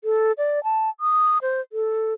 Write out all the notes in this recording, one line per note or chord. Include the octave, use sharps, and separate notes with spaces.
A4
D5
A5
D#6
C5
A4